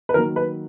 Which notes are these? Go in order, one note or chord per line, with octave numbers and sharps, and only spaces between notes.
B4
D#3 F#3 A#3 A#4
B4